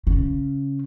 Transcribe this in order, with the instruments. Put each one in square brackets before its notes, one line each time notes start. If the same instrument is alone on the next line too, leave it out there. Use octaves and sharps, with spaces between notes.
[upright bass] C#3